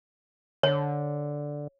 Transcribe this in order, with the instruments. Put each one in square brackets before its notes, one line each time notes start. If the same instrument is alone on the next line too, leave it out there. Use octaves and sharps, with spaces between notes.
[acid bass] D3 [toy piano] C#5